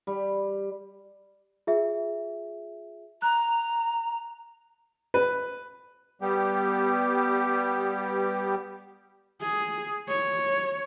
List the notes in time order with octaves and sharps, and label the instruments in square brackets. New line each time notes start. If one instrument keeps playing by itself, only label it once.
[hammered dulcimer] G3
[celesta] F4 G#4 E5
[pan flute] A#5 [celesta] F#6
[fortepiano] B4
[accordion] G3 B3 G4
[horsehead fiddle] G#4
C#5